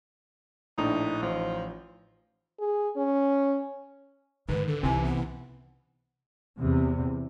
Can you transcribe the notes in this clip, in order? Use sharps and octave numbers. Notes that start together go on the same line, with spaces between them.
A#1 A2 D4 D#4
A1 F3 D#4
G#4
C#4
G#2 D#3 B4
D3 A4
C2 C3 E3 D#4 G#5
B3
E2 C3